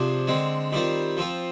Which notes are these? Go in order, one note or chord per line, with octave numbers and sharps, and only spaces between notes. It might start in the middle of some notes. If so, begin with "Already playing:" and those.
Already playing: C3 F3 D4 G#4
D3 G#3 C4
D#3 G3 C4 F4 C5
F3 C4 F4